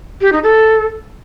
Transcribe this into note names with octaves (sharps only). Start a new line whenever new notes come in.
G4
D#4
A4